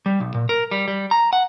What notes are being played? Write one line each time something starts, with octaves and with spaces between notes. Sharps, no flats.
G3
B1
A#2
A#4
G3
G3
A#5
F#5